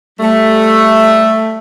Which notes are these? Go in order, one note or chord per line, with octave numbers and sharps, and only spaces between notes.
G3 A3